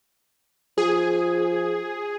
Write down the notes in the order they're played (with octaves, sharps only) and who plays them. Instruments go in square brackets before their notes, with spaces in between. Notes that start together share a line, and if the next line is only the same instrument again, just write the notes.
[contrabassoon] F3 [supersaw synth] G#4